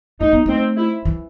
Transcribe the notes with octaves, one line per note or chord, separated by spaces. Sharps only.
A3 D#4
B3
A3 C4
E4
E3